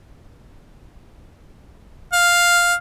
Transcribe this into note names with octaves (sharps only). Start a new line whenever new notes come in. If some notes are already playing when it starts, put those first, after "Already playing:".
F5